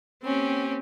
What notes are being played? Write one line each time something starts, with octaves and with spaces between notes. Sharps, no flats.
A#3 C4 C#4 G4